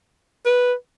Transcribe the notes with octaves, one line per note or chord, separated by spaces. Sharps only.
B4